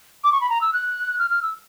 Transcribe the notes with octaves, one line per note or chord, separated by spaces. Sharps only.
D6
C#6
B5
A#5
E6
F#6
F6
F6
E6